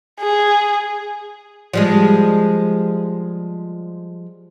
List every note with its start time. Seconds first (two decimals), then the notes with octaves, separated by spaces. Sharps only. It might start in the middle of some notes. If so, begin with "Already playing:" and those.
0.21 G#4
1.73 F3 G3 G#3